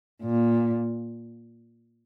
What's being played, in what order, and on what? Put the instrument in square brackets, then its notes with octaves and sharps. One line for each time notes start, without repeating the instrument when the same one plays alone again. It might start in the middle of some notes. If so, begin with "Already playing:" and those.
[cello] A#2